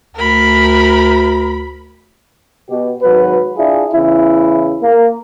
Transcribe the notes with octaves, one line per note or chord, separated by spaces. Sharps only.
D2 A#4 B5
B2 G4
G#1 F#3 B4
D4 E4 F4 G#4
E2 C#3 E4
A#3